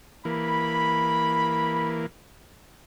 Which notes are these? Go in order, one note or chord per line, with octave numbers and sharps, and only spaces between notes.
E3 A#3 B5